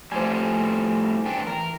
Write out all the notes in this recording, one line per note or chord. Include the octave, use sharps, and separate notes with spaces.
A2 F3 G3 A3 C5 G#5
E2 D4 G5
E3 A#4